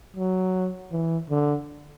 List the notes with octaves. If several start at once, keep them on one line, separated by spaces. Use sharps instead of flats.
F#3
E3
D3